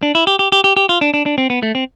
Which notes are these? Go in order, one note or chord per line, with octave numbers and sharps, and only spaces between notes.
D4
E4
G4
G4
G4
G4
G4
F4
D4
D4
D4
C4
B3
A3
C4